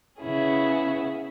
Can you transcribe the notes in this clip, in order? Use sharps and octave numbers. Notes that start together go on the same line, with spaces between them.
C#3 B3 C#4 E4 G#4